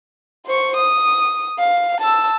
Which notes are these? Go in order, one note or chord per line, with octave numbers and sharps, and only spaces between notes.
C5 C#6
D#6
F5
A5 E6